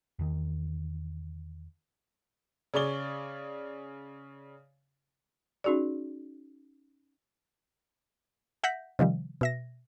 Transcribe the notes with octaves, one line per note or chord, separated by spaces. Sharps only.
E2 D#3
C#3 G#4 C#5 D5 G7
C#4 D#4 F#4 G#4 D5
E5 F#5 G6 A#6 B6
C3 D#3 F3 G3
B2 E5 A#6